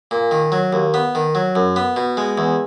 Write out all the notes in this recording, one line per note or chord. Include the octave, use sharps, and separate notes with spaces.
A#2
D#3
F#3
D#2
B3
D#3
F#3
F#2
B3
B2
G#3
E2